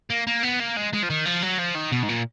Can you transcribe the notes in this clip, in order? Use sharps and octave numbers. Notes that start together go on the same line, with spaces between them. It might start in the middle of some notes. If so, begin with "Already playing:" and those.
A#3
A#3
B3
A#3
G#3
G#3
F3
D#3
F3
F#3
F3
D#3
B2
G#2
A#2